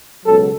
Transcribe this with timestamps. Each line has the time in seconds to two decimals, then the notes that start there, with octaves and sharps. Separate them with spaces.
0.25 C#2 B2 F#3 A4